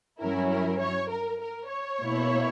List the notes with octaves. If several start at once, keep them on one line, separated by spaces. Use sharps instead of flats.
G2 F#3 C#4 E4 A#4
A#4
C#5
A#4
A#4
C#5
B2 A#3 E4